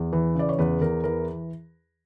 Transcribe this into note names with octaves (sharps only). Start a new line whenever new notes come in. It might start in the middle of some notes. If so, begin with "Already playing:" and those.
Already playing: E2
E3
C#3 D5
C#5
E2 B4
E2 A#4
E3 A#4